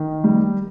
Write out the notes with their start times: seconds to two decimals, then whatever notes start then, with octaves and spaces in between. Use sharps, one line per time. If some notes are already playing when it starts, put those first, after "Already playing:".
Already playing: D#3
0.24 G3